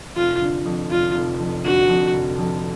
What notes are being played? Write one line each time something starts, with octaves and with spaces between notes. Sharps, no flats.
F1 F4
D3
F2
F1 F4
F1
F2
D3 F#4
F2
F1
F2